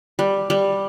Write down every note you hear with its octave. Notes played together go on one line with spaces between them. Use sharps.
G3
G3